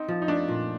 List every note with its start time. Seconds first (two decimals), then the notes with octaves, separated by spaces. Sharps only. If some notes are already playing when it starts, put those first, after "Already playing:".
Already playing: C4 D#4
0.08 F3
0.22 D#4
0.28 A3 D4
0.48 A#2